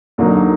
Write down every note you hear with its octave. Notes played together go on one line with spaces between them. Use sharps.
D#2 D3 F#3 A#3 D#4